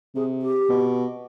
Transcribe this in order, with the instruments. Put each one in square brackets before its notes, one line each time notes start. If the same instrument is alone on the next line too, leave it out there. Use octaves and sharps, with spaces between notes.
[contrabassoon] C3 [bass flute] G#4
[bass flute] G4
[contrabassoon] B2